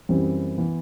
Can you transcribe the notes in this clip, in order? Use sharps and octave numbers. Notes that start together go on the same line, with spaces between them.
F#2 E3 G3 C4
E3 B3